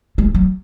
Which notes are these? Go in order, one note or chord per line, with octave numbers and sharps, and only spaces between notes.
G#3
F#3